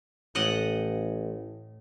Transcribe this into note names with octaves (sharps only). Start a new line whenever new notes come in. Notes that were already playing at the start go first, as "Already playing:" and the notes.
A1 A2 D#5 F#5